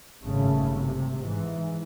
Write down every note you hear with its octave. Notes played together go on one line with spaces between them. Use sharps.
G#1 G2 A#2 C#3 A3
C3
G#2 E3